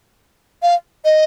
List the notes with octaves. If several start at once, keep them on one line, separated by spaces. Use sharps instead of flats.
F5
D#5